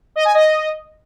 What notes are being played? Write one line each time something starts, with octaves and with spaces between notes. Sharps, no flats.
D#5
G#5
D#5